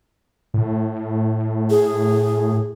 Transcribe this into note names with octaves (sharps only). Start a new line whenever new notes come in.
A2
G#4